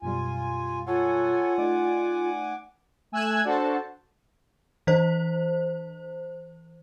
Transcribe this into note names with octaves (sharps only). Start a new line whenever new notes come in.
F#2 B2 G3 F4 G#5
F4 A4 C#5 F#5 G#5
A3 D#4 D5 D6
A3 G#5 E6 F#6 G#6
D4 F#4 A4 C5 A5
E3 C5